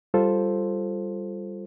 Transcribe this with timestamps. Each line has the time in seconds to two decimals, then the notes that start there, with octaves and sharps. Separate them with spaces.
0.14 G3 F4 A4 C5